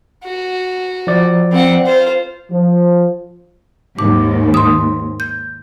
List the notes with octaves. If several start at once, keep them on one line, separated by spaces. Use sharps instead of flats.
F#4
F3 D5
C4 F#5
F4 C5
F3
D#2 G#2 D6
C6 D#6
G6